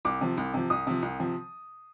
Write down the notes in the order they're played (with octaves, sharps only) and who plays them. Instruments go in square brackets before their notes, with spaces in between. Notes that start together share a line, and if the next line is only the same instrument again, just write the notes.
[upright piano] C2 D6
C3 F3
C2
C3 F3
C2 D#6
C3 F3
C2
C3 F3